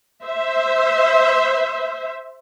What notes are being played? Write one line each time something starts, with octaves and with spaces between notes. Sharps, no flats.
C5 E5